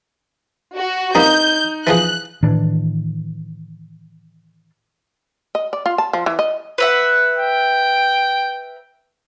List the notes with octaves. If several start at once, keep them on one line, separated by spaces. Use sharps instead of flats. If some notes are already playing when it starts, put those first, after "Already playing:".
F#4
G3 A#3 C4 D#4 G6
E3 F3 G#4 F#6
A2 D#3 E3 D4
D#5
D5
F4
A5
F3
E3
D#5
B4 E5 F#5
G5